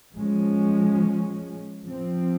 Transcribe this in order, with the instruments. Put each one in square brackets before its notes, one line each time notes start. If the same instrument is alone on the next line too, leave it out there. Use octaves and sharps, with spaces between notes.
[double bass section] F3 G#3 C#4
F3 C4